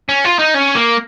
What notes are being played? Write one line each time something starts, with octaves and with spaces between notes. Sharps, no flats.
C#4
F4
D#4
C#4
A#3